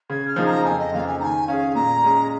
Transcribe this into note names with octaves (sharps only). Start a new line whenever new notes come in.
C#3 G#6
F6
F3 A#3 D#4 G#4
A#5
F2 G#5
D#5
C#3 F3 A#3 F5
G#5
D#3 G#5 A#5
C#4 G#4 F5
A#2 A#5
G#3 C#4 G#4